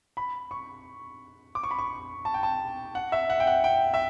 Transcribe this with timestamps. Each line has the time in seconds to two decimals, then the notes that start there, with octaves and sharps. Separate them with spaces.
0.17 B5
0.51 C#6
1.55 D6
1.63 C#6
1.71 B5
1.79 C#6
2.25 A5
2.34 G5
2.43 A5
2.95 F#5
3.12 E5
3.30 F#5
3.40 G5
3.47 F#5
3.64 G5
3.94 E5